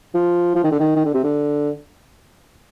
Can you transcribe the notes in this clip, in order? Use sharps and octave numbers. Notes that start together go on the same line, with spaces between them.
F3
F3
D#3
D3
D#3
D#3
D3
C3
D3